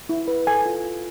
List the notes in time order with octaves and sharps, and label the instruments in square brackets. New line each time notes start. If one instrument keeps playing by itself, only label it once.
[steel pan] E4
B4
A4 G#5
F4
F4